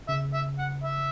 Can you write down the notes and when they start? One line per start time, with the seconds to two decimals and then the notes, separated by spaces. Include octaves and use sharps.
0.08 C#3 E5
0.34 E5
0.59 F#5
0.83 E5